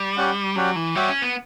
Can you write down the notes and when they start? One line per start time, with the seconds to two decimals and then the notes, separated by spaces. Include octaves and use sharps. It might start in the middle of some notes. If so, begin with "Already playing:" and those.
Already playing: G3
0.17 C#4 G4 D5 F#5
0.56 F#3 C#4 G4 D5 F#5
0.76 E3
0.95 G3 F#4 C#5 E5 G5
1.09 C#4
1.22 B3